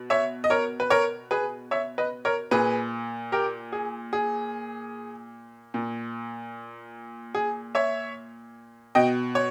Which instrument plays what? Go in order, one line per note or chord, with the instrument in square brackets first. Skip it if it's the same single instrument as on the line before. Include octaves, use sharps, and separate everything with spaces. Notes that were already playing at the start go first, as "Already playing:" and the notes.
Already playing: [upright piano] B2
C#5 E5
D#5
A#4 C#5
B4
A#4 C#5
G#4 B4
C#5 E5
B4 D#5
A#4 C#5
A#2 G#4 B4
G4 A#4
G#4
G#4
A#2
G#4
C#5 E5
B2 D#5 G5
C#5